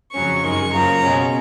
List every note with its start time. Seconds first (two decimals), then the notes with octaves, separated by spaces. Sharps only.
0.14 F2 C#3 F#3 C#4 C#6
0.44 F#2 D#3 G#3 C#6
0.74 F#2 C#3 F3 A#3 A#5
1.03 B2 G#3 C#4